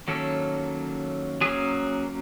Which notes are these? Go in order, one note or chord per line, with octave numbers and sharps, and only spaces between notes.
D#3 F#3 A#3 C#4 A4
F#3 A#3 C#4 G#4